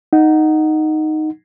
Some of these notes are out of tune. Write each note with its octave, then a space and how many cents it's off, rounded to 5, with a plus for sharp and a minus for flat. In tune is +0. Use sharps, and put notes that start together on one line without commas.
D#4 +0 F#5 +0